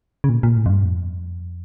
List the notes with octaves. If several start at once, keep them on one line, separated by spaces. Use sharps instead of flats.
C#3
A#2
A#2
A2
F2
G2
F2